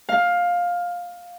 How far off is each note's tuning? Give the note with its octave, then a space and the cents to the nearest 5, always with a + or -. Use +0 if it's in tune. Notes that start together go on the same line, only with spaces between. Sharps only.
F5 +15